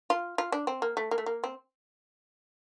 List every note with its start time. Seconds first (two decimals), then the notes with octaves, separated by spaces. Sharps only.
0.10 F4
0.38 F4
0.52 D4
0.67 C4
0.82 A#3
0.97 A3
1.11 A#3
1.18 A3
1.26 A#3
1.44 C4